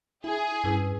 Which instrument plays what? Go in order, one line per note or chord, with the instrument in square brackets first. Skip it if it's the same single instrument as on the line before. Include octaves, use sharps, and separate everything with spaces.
[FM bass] E4 [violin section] G#4
[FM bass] G2 [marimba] C#4 E4 B4